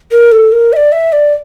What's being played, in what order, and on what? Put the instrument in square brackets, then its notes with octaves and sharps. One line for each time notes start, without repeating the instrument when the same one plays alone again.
[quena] A#4
A4
A#4
E5
D5
E5
D5